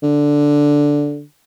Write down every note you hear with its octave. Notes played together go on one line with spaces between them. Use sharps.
D3